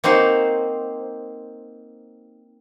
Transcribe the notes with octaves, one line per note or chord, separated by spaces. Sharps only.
A#3 C4 D#4 F#4 C5